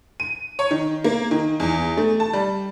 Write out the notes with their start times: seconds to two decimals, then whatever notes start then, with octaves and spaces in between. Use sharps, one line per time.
0.20 D#7
0.59 C#5
0.71 D#3
1.04 A#3
1.31 D#3
1.60 E2
1.97 A3
2.20 A5
2.33 G3